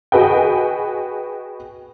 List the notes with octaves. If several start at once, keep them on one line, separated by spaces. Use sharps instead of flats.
F#4 G#4 B4 D#5 G5